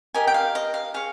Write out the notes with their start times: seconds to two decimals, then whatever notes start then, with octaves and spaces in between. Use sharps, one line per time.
0.14 G4 A#4 D#5 G#5
0.27 G5
0.34 F5
0.55 D#5
0.74 F5
0.94 G#4 C#5 F5